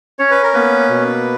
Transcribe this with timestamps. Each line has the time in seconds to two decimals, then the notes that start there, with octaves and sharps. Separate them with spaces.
0.19 C#4 C#5
0.31 B4
0.43 A#4
0.54 A#3 B3 B4
0.89 B2